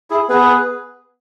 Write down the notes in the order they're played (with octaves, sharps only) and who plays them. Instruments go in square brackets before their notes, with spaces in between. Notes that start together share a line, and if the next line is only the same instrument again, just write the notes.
[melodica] E4 G#4
[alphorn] B3 [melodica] G#4 B4